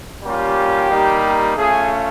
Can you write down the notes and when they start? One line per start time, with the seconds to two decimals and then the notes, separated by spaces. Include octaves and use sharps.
0.23 G3 A#3 C#4 F4 G4
0.90 G3 A#3 D#4
1.57 A3 C#4 F4 G#4